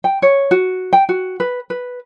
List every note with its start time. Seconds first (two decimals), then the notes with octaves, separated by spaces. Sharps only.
0.04 G5
0.22 C#5
0.51 F#4
0.93 G5
1.09 F#4
1.40 B4
1.70 B4